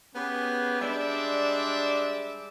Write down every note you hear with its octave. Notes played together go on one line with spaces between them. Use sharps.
B3 C#4 G4 G#4 B4
G3 G#3 D4 D5 E5